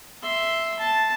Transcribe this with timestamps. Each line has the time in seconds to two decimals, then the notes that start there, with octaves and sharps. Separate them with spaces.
0.22 E5 C6
0.79 A5